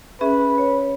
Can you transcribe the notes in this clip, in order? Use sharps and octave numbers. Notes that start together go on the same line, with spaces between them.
C#4 G#4 B4 E5
C#5